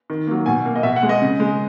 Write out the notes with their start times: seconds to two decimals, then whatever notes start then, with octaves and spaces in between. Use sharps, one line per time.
0.10 D#3
0.27 F#3 A#3
0.46 B2 G#5
0.65 A#3
0.76 D#5
0.83 B2 E5
0.96 F#5
1.03 G#3
1.09 D#5
1.22 C#3
1.40 G#3